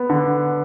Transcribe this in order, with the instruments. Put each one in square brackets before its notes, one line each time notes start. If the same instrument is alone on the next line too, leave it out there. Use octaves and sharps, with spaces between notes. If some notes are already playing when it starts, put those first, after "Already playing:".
Already playing: [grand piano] B3
D3